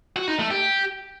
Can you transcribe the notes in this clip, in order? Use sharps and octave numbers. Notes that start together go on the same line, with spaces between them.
F#4
D#4
A3
G4